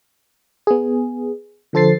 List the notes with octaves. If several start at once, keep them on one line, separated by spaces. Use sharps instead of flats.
B3 G#4
D3 F3 A4 C5 A6 C7